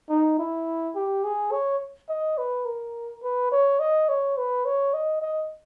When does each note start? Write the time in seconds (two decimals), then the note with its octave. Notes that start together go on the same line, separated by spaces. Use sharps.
0.09 D#4
0.38 E4
0.95 G4
1.24 G#4
1.51 C#5
2.09 D#5
2.38 B4
2.65 A#4
3.23 B4
3.51 C#5
3.79 D#5
4.08 C#5
4.37 B4
4.65 C#5
4.93 D#5
5.22 D#5